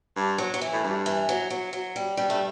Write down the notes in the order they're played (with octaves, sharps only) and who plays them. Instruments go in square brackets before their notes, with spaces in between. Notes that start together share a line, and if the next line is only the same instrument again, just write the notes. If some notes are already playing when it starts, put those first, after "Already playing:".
[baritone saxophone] G2
[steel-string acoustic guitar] F#3
F#3
E3
[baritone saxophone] A2
G2
[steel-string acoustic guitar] E3
F#3
F#3
F#3
G3
[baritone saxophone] G2 [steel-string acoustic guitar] G3
[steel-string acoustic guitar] A3